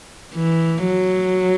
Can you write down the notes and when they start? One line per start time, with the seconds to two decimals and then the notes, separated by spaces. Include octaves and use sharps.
0.34 E3
0.87 F#3